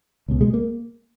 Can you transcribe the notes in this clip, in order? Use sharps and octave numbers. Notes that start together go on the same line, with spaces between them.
C#2 B2
G#3
A#3